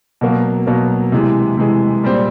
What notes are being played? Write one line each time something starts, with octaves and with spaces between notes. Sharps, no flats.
B2 F#3 A#3
B2 F#3 A#3
C3 E3 G#3
C3 E3 G#3
A#2 G3 C4